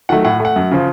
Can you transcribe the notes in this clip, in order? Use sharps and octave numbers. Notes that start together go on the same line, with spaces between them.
D#3 F#3 A3 F#5
A2 F#5
A3 F#5
F#2
C#3 F3